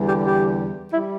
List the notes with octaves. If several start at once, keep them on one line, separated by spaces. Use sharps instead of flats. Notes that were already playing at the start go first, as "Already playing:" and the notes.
Already playing: E2 D3 G3
G4
G4
G3 E4